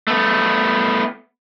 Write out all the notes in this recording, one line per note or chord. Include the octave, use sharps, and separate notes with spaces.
A3 B3